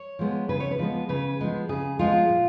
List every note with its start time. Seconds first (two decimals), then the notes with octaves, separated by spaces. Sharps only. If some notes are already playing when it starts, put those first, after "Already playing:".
Already playing: C#5
0.19 F3 G#3 B3
0.49 C#3 B4
0.60 C#5
0.71 B4
0.79 F3 G#3 B3
1.09 C#3 B4
1.39 F3 G#3 B3
1.69 C#3 G#4
1.99 F3 G#3 B3 F4
2.29 A#2